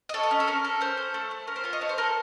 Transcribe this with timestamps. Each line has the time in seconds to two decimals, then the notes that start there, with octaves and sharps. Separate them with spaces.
0.09 D#5
0.14 A4 C#5
0.23 D#5
0.31 C#4
0.40 A4
0.48 C#4 A#4
0.65 A4
0.80 C#4 C5
0.97 A4
1.14 A3
1.31 A3
1.47 C#4 A#4
1.56 C5
1.64 F4 C#5
1.73 D#5
1.81 A3 C#5
1.89 C5
1.98 A4 A#4